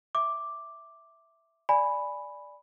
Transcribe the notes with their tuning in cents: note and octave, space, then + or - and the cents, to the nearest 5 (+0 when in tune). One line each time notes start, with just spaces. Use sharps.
E5 +0 D6 +0
D5 +0 G#5 +0 B5 +0